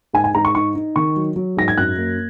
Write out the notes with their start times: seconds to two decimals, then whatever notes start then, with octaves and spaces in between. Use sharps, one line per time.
0.13 G#2 G#5
0.24 G#5
0.34 G#2 A#5
0.45 C#6
0.55 D#4 C#6
0.75 D#4
0.96 D#3 C#6
1.16 F#3
1.36 F#3
1.57 G#2 A#6
1.68 G#6
1.77 F#2 F#6
1.98 A#3